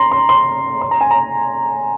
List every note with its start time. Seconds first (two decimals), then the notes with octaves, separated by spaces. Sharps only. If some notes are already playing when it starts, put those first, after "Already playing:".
Already playing: A#5 C6
0.12 C6
0.29 C6
0.81 C6
0.91 A#5
1.01 G#5
1.11 A#5